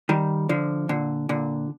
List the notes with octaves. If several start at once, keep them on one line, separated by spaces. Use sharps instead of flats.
D#3 G3
D3 F3
A#2 D3
A#2 D3